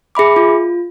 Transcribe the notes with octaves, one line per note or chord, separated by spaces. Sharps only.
G#4 E5 B5 D6
F4